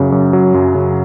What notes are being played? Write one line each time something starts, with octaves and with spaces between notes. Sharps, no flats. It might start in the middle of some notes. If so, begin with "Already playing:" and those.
Already playing: F#2 C#3 F#3
F#2
F#3
F#2
C#3